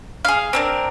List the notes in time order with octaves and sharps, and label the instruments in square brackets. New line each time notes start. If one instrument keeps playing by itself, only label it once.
[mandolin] G#4 F5
C4 D4 A#4